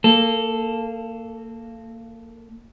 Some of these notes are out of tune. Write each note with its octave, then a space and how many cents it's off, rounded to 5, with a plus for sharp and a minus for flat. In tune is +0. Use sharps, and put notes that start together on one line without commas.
A#3 -25 A4 +0